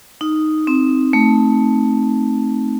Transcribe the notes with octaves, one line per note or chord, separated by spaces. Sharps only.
D#4
C4
A3